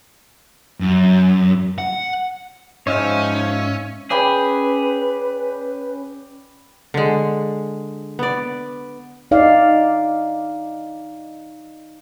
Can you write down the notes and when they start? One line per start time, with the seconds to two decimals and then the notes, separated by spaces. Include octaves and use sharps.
0.80 F#2
1.78 F#5
2.87 G#2 F3 C#4 D#4 C#5 E5 F5
4.10 C#4 G#4 B4 D5 G5 B5
6.94 D3 G#3
8.19 B3 D5
9.31 D#4 D5 F5